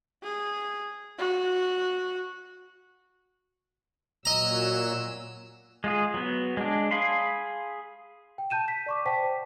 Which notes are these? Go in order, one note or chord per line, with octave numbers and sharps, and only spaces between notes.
G#4
F#4
A#2 F#3 D#5 A#5 E6
G#3 F4 G#4
F#3 B3
G#3 D4
G#4 F5 B5 C6
G5
A5 G6 D#7 E7
B6
D5 C#6 D6
C5 D5 F#5 G5 A5 B6